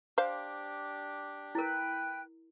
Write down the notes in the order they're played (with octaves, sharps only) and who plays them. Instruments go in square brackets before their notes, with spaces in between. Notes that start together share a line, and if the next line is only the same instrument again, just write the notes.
[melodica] D4 G4 [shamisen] C5 F5
[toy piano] E4 A#4 [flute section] B4 G5